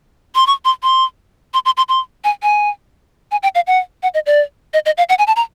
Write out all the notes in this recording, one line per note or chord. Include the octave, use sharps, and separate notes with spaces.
C6
C#6
C6
C6
C6
C6
C6
C6
G#5
G#5
G#5
G5
F5
F#5
F#5
D#5
D5
D#5
D#5
F5
F#5
G#5
A5
A#5